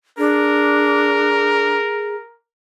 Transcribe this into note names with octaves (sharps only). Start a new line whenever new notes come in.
D4 G#4 A#4